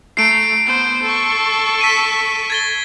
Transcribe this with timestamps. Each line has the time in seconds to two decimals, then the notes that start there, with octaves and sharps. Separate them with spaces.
0.17 A3 A#5 C7 D7
0.65 B3 C5
1.02 A4 C#6
1.81 B6 D#7
2.50 G#6 A6 G7